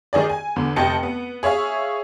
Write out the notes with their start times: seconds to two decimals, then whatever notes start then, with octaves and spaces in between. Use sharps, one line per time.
0.13 D#3 D#4 G#4 D5
0.30 G#5
0.56 E2 D3
0.76 F1 D#5 G5 A5 C#7
1.03 B3
1.43 G#4 C#5 E5 F5